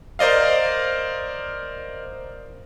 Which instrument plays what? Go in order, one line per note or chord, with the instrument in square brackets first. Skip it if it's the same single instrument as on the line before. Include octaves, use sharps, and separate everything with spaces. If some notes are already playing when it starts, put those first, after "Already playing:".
[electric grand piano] A#4 C5 D5 D#5 F5